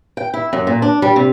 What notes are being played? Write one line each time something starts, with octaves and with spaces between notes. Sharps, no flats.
G5
E4
F#2
A#2
D4
G3
C3